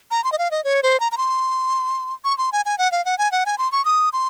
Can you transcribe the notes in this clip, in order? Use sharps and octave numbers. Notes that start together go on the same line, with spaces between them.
A#5
C6
D#5
F5
D#5
C#5
C5
A#5
A#5
C6
C#6
C6
G#5
G#5
F#5
F5
F#5
G#5
F#5
G#5
C6
C#6
D#6
C6